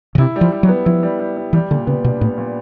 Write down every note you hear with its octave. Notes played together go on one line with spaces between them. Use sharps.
C#3
C3 E4
G3
F3
G3
F#3
B3
F3 E4
G3
G3
G3
E3 G3
A#2 D3
C#3 B3
B2 D4
A2 B3
A#2